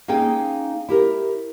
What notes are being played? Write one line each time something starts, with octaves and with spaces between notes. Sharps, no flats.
A#3 C#4 D#4 G#4 F5 G5
E4 G4 A#4